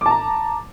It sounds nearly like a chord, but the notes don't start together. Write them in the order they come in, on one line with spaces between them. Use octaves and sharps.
D6 A5 A#5